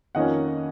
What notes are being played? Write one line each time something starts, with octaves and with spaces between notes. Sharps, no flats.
F2 D#3 A#3 C#4 D#5 F#5